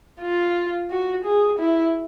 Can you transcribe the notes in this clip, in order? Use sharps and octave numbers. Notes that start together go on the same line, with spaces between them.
F4
F#4
G#4
E4